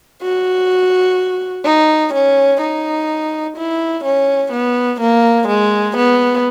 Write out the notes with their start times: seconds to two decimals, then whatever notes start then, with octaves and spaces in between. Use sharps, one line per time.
0.22 F#4
1.65 D#4
2.14 C#4
2.61 D#4
3.57 E4
4.04 C#4
4.52 B3
5.01 A#3
5.48 G#3
5.97 B3